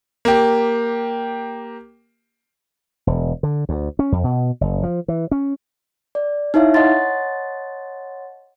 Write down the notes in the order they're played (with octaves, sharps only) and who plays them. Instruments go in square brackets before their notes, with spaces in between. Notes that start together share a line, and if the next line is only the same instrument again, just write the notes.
[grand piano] A#3 G4
[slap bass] E1
D3
D2
C#4
F2
B2
F#1
F3
E3
C#4
[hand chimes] D5
D#4 E4 C#5 E5 F5
C#5 D#5 F#5 A5 C6 A6